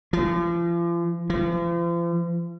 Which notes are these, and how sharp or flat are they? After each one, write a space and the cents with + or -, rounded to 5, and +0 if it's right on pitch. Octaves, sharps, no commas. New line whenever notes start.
F3 -40
F3 -40